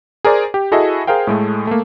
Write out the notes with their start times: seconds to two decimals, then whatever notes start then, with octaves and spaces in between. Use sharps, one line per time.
0.25 G#4 A#4 C5 D5
0.54 G4
0.72 E4 F#4 G#4 A4 D#5 E5
1.07 G#4 A#4 C5 F5 G5
1.27 A2 G#3 A3
1.67 A3 A#3